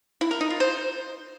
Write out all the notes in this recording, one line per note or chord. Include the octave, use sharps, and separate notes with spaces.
E4
A#4
D#4
F4
C5